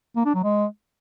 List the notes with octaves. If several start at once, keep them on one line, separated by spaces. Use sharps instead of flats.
A#3
D4
F#3
G#3